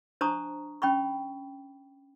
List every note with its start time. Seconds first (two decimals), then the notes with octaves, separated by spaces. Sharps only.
0.21 D4 C5 A5 A#5 C#6 D#6
0.82 C#4 G5 B5 C#6